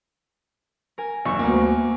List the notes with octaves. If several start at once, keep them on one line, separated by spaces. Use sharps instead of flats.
A#4 G#5
F1 G2 C#6 E6
D2 A#3 B3 G#5